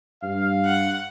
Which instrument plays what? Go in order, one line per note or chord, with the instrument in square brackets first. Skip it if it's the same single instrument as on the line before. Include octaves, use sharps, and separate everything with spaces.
[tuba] G2 [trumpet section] F5
[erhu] F#5